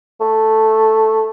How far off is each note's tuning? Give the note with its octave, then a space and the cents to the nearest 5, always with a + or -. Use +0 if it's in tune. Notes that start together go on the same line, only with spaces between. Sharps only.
A3 +0